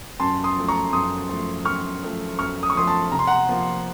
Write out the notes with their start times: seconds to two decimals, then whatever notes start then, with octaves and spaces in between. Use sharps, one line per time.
0.20 F#2 A5 C6
0.44 C6 D#6
0.56 F3 A3
0.68 A#5 C#6
0.93 F#2 C6 D#6
1.29 F3 A3
1.65 F#2 C#6 F6
2.02 F3 A3
2.39 F#2 C#6 F6
2.63 D#6
2.70 C#6
2.75 F3 A3 C6 D#6
2.87 A5 C6
3.12 C3 A#5
3.19 C6
3.27 F#5 A#5
3.49 F3 A#3 F4